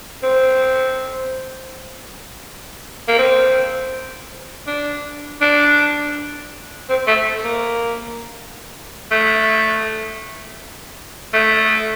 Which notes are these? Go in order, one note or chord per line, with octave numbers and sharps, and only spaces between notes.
C4
A#3
C4
D4
D4
C4
A3
A#3
A3
A3